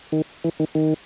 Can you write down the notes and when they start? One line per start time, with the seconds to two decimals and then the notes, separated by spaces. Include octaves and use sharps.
0.12 D#3
0.44 E3
0.60 D#3
0.75 D#3